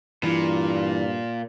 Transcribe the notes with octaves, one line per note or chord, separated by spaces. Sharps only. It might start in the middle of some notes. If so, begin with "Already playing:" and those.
G2 A#2 E3